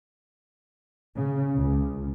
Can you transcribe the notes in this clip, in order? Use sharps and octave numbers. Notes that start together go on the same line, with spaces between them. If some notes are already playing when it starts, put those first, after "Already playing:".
C#3
C#2